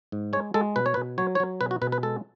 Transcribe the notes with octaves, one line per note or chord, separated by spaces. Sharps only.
G#2
G#3 C#5
G#3 A4
B2 B4
C#5
B4
B2
F#3 C#5
C#5
F#3
B2 B4
F#4
B2 B4
B4
G#3 A4